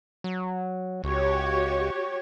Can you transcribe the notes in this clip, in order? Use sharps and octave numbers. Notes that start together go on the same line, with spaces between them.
F#3
C#2 F#4 G4 C#5